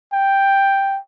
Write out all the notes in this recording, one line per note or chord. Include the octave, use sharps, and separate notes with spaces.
G5